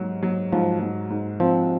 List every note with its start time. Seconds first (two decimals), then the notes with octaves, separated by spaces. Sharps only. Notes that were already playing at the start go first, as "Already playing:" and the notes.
Already playing: G#2 F#3
0.23 F#3
0.52 G#2 F3
0.81 G#2
1.10 G#2
1.40 F3 C4